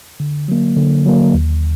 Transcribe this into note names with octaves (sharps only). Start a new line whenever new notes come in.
D3
F#3 A#3
D3
F#3 A#3
D#2